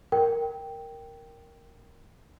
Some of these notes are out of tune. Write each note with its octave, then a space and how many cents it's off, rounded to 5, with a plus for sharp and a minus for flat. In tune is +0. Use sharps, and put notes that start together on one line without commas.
A#4 +0 G5 +0